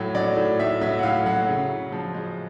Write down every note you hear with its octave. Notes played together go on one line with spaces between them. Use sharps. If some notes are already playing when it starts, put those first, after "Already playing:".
Already playing: A2 F#3
F#3 D5
A2
A2 E5
F#3 E5
F#5
A2 F5
F#3 F#5
C#3
C#3
F3
G#3